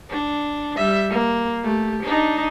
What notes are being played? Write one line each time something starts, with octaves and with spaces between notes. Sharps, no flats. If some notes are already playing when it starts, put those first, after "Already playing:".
D4
G3 E5
A#3
A3 G4
D4 D#4